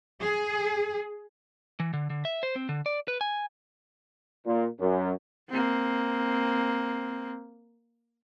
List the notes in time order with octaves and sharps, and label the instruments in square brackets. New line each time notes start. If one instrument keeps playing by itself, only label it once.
[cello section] G#4
[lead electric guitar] E3
D3
D3
E5
C5
C4
D3
D5
B4
G#5
[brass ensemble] A#2
F#2
[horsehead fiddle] A#3 C4